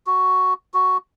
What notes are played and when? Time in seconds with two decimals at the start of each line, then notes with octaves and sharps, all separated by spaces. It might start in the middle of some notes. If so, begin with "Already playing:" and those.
0.07 F#4
0.74 F#4